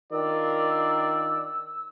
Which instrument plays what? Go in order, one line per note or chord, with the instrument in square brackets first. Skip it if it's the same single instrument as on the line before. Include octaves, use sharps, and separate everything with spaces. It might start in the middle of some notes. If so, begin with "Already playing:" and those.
[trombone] D#3 [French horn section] D4 F4 A#4 [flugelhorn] D5 [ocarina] E6